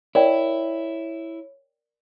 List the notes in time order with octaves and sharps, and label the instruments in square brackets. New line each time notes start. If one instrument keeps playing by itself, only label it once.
[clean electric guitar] E4 [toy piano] A#4 D5 G5 [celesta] C#5